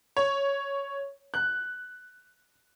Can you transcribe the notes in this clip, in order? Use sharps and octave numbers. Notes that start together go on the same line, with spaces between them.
C#5
F#6